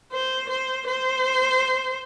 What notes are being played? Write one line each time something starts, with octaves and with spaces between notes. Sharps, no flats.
C5
C5
C5